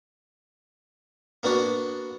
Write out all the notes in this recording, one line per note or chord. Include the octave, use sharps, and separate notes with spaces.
A#3 B3 D4 F#4